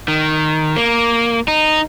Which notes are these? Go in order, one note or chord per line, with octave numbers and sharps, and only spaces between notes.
D#3
A#3
D#4